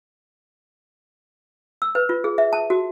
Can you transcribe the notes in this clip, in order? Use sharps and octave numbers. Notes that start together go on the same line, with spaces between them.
E6
B4
F4
G#4
E5
A5
F#4